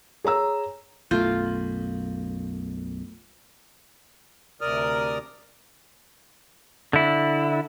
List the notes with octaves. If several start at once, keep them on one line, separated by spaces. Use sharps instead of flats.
G#4 C#5 A#5 E6
B1 F#2 A3 F4 G6
D2 C3 A#4 D5 D#6 F6
D3 E4